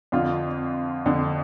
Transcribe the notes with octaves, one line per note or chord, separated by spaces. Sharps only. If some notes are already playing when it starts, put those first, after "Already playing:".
F2 D3 F4
F2 D3